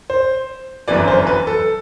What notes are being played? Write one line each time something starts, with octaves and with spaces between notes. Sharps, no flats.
C5
G1 F#2 E3 D5
C5
B4
A4